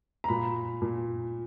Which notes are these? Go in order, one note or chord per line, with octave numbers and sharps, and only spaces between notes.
A#5
A#2 B5
A#2